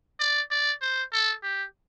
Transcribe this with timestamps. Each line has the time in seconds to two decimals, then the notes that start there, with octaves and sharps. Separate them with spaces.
0.20 D5
0.51 D5
0.82 C5
1.13 A4
1.43 G4